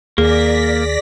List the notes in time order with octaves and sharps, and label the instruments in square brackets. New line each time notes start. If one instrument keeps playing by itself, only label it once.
[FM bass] D#2 [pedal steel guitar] A#3 [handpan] G#4 [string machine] D5 A#6 B6